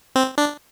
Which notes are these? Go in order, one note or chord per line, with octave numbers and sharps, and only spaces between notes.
C4
D4